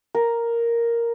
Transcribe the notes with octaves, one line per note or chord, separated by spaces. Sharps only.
A#4